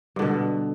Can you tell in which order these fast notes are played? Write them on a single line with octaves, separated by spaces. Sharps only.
G2 D3 B2